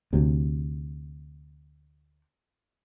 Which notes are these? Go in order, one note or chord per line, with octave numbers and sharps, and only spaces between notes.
D2 C3